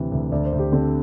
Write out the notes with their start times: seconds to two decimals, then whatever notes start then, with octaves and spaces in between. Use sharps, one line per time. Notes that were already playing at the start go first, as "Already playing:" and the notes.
Already playing: D2 C3 E3
0.12 D2
0.32 D2 D5
0.45 C5
0.52 D2
0.59 G4
0.72 D3 C4